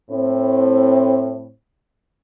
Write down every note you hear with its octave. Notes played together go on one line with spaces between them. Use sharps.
A2 C4